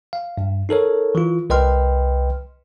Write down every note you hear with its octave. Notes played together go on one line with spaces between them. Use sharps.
F5
G2
D#4 A4 A#4 C#5
E3 F4
C2 B4 D#5 G5 C6 F6